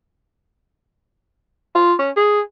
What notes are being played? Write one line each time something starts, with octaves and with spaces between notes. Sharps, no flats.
F4
C#4
G#4